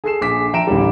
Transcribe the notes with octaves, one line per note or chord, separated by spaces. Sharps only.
G#4 A4 C7 E7
A#1 G#5 D6 B6
F3 E5 G5 A#5 D7 E7
A1 D2 D#3 G3